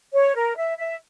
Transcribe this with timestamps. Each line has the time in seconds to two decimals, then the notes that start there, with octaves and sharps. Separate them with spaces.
0.13 C#5
0.35 A#4
0.55 E5
0.78 E5